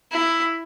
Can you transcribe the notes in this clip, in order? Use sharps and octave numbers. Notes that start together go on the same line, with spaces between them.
E4